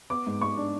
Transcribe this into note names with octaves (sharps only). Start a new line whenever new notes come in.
B3 D6
G#2
G#2 C#6
D4